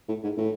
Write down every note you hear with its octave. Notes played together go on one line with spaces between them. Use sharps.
A2
G#2
A2